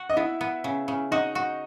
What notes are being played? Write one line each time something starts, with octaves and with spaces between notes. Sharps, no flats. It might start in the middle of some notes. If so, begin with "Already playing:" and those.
Already playing: F#4
D#5
B3 E4 E5
B3
C#3
C#3
D#4 F#4 D#5
F#4